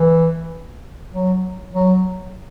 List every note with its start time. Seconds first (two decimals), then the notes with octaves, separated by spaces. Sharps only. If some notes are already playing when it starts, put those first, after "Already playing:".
Already playing: E3
1.13 F#3
1.74 F#3